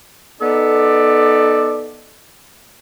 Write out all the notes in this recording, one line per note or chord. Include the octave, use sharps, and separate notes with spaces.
B3 D#4 A4 D5